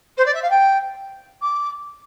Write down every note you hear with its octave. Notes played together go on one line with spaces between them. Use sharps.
C5
D5
E5
F5
G5
D6